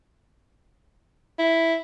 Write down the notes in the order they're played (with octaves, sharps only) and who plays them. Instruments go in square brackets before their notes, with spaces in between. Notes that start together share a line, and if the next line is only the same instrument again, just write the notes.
[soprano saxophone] E4